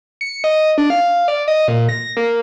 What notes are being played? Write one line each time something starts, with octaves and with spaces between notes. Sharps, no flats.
C#7
D#5
D4
F5
D5
D#5
A#2
A#6
A#3